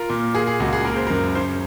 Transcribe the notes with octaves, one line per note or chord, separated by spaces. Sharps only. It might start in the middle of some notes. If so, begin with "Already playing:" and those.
Already playing: F4 A#4
A#2
A#3 G#4
G#4
C#2 F#4
G#4
A#3 A#4
C5
F#2 A#4
C#4 C5